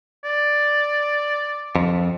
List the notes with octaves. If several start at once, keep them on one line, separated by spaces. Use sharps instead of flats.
D5
F2